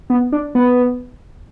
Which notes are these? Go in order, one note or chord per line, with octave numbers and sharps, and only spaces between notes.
B3
D4
B3